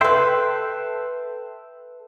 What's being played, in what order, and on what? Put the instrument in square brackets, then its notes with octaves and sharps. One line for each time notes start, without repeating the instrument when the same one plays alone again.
[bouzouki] A4 B4 [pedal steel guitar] E5 G5 C6